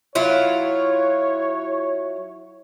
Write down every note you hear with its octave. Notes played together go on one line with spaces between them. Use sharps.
F#3 E4 F4 C#5